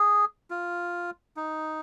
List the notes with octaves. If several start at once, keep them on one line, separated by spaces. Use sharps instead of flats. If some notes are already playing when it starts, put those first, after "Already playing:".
Already playing: G#4
F4
D#4